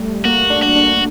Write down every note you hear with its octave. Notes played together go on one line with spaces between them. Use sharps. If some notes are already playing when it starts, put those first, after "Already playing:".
Already playing: G3 A3
A#3 F#4
D4
F#4
D4